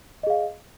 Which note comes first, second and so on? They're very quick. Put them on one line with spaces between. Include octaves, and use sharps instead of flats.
D#5 G#4 F5